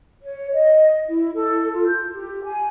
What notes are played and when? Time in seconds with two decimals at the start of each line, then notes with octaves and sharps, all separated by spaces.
0.22 C#5
0.53 D#5
1.07 E4
1.35 A4
1.72 F4
1.87 G6
2.12 G4
2.45 G#5